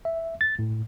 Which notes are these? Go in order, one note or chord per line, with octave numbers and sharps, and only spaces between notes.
E5
A6
A2